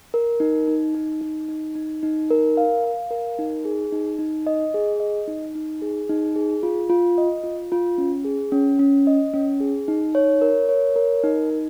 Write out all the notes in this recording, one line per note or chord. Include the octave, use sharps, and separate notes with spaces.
A#4
D#4
D#4
D#4
D#4
D#4
D#4
D#4
A#4
F5
F5
A#4
D#4
G#4
D#4
D#4
D#5
G#4
D#5
D#4
D#4
G#4
D#4
G#4
F4
F4
D#5
F4
F4
C#4
G#4
C#4
C#4
D#5
C#4
G#4
D#4
C#5
A#4
C#5
A#4
D#4
D#4